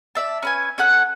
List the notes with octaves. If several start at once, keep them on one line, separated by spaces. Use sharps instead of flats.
D5 E5 A5
C#4 B4 G#5
C#4 A4 F#5 F#6